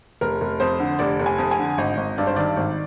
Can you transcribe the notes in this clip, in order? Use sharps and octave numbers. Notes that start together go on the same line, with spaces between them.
F1 A#4
F1
F2 C5
D3
F1 D5
F1
G#5
F2
G#5
D3
G#1 D#5
G#1
G2 D5
C5
D#3 D5
G#1